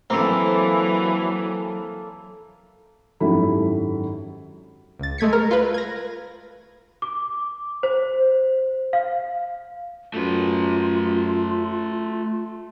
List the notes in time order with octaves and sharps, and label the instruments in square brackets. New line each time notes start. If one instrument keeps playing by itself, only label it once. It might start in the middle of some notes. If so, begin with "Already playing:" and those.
[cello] E3 [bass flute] F#3 [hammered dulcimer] A#3 A4 [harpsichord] C4
[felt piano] G#1 F#2 E4 G4 A4 B5
[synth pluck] C#2 A6
G#3 A3 G#6 B6 C#7
A#4
F4 B4
G#6 A#6
[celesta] D6
C5
F5
[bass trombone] F#2 [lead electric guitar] A3 B4 [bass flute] F4